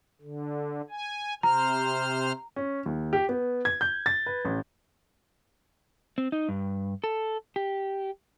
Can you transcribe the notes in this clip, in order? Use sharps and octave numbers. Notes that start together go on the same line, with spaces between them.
D3
G#5
C3 C5 A#5 F6
C#4
D#2
G4
B3
G#6
G6
A6
B4
A1
C4
D#4
G2
A4
G4